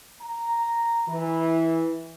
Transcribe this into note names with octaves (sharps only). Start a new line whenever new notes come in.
A#5
E3